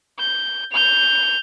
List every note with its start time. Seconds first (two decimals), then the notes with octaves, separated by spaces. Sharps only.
0.19 G6
0.73 G6 F7